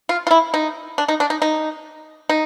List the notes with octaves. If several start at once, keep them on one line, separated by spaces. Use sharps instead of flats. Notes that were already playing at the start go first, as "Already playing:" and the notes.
F4
F4
E4
D#4
D4
D#4
D4
D#4
D#4
D#4